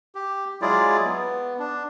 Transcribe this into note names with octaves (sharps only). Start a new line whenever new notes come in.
G4
F#3 G#3 E4 F4 G#4 D5
B3
D4